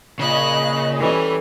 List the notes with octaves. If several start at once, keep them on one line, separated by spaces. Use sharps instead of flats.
A#2 C#3 D#5 B5 F#6
E3 G3 C#4 A4